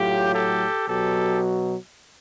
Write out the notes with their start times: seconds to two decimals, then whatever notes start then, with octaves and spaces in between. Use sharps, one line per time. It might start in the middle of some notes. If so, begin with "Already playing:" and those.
Already playing: A2 F#3 F4 G4
0.33 G4 A4
0.87 B2 F#3 G4 A4